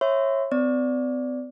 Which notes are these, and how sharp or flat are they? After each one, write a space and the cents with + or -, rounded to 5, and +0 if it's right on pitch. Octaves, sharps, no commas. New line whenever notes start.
C#5 -25 E5 +0 C6 -40
C4 -45 D5 -10